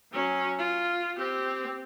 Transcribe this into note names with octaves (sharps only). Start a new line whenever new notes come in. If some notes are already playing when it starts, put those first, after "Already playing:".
F#3 C#4
F4
C4 G4